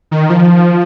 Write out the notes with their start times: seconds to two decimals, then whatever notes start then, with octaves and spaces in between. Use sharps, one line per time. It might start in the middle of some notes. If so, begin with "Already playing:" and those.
0.11 D#3
0.30 F3